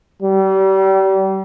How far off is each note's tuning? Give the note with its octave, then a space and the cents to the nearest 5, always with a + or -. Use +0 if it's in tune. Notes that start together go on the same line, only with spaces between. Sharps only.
G3 -35